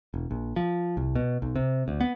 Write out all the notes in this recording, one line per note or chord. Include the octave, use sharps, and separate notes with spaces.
E1
A#1
F3
C2
B2
B1
C3
D2
B3